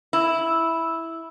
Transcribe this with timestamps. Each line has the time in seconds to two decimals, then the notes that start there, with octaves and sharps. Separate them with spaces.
0.13 E4